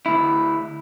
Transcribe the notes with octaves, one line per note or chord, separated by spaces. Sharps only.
D2 E4